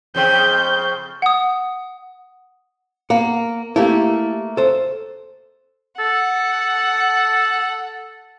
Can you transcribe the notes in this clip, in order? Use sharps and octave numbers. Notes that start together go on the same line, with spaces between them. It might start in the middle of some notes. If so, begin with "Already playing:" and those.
F2 C#3 C4 G6
F#5 D#6
A#3 F#5
A3 A#3 E4 G4
A4 C5
A4 F#5